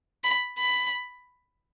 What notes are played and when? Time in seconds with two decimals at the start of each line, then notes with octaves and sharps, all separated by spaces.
0.24 B5
0.58 B5